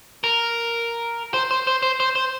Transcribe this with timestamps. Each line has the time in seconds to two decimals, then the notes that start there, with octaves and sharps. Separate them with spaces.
0.24 A#4
1.34 C5
1.51 C5
1.67 C5
1.83 C5
2.00 C5
2.16 C5